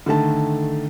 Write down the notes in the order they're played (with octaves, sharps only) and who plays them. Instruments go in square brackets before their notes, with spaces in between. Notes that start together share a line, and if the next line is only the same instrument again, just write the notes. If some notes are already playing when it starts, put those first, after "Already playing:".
[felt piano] D3 D#3 A3 A5